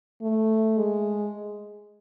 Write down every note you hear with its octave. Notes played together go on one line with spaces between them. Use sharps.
A3
G#3